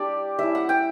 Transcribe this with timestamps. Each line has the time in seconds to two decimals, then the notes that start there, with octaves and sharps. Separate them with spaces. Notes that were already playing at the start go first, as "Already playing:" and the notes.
Already playing: G3 D4 G4 D5
0.39 G3 C#4 E4 E5
0.55 F#5
0.69 G5